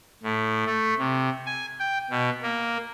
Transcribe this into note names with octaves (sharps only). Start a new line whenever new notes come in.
A2
A3
C3
G#5
G5
B2
A#3